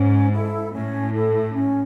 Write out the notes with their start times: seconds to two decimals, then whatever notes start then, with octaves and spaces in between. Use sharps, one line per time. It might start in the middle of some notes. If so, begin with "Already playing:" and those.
Already playing: G#2 C#4
0.32 E4 A4
0.72 A2 C#4
1.12 E4 A4
1.53 C#4